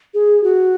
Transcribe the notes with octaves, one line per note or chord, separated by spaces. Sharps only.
G#4
F#4